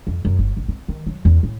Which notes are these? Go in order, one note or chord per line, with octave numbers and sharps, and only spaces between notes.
F2
F#2
G1
A1
C4
D#3
F#3
E2
A2